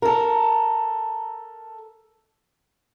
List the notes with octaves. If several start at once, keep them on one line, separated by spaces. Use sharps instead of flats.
A4 A#4